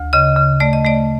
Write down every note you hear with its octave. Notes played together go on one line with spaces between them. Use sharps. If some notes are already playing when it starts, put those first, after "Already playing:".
Already playing: D2
C#3 D#5
C#3
A3 D5
D#5
A3 D5